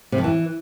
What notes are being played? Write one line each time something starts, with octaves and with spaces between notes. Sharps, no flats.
C3
F2
E3